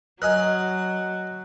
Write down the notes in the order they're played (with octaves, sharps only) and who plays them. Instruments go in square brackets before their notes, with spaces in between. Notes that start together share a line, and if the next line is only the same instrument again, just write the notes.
[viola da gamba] F#3 [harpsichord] A#4 D#5 G#5 [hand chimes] F#6